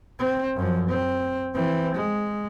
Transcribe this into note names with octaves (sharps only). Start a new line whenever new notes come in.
C4
F#2 F3
C4
E3 C4
G#3